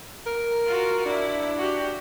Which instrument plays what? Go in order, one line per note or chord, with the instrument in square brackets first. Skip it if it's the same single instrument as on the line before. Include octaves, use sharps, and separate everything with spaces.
[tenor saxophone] A#4
[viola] F4 F#4
[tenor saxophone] D4 [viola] E4
[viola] F#4 G4